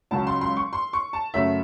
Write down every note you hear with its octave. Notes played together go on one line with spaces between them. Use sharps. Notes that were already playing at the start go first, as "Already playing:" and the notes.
C#2 C#3 F#3 C#4 A5
C6
C6
C#6
C6
C#6
A5
F#2 C#3 F#3 A3 C#4 E5